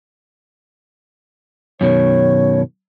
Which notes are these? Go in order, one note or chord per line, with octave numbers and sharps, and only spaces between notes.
F#2 B2 D#3 C#5